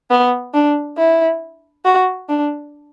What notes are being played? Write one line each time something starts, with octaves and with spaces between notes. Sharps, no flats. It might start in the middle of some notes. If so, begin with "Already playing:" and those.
B3
D4
E4
F#4
D4